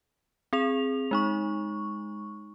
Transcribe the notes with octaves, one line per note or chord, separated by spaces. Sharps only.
C4 G#4 F7
G#3 D#4 C#6